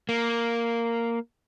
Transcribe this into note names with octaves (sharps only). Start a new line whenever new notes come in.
A#3